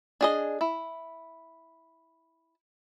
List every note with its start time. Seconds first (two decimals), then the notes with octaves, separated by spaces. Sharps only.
0.21 D4 G#4 D#5
0.61 E4